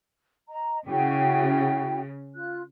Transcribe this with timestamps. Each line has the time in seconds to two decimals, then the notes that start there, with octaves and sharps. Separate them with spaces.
0.49 D#5 A#5
0.87 C#3 E4 F#4 G5
2.35 F4 F#6